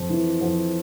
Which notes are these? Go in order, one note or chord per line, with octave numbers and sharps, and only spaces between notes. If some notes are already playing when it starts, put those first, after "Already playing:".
Already playing: F2
E3
F2